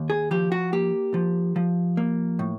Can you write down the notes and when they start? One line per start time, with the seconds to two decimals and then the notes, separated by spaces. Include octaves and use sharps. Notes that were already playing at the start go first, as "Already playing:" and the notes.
Already playing: D#2
0.10 G#4
0.31 F3 G4
0.52 F#4
0.72 A#3 G4
1.14 F3
1.56 F3
1.97 A#3
2.39 A2